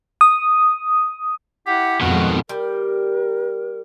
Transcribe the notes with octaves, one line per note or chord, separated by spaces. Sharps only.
D#6
E4 G4 F#5
F2 G#2 B2 D#3 F4 F#4 F#5
G3 A#4